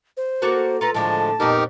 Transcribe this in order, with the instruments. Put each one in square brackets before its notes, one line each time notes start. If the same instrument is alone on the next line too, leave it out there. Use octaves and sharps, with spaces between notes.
[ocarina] C5
[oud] A#3 F#4 A4
[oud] F4 A4 B4 [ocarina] A#5
[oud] A2 D3 D#3 [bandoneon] F3 G#3 [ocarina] A5
[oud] F2 A#2 B3 [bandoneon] D#4 G4 A#4